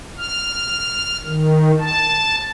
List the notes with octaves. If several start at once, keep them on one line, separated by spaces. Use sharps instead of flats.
F6
D#3
A5